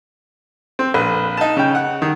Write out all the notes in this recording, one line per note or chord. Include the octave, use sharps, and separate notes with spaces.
C4
A#1 B4
D#4 A5
C#3 G5
F#5
D#3